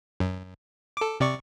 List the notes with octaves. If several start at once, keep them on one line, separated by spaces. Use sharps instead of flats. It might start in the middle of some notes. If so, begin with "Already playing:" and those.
F#2
A4 D6
C3 D5 C#6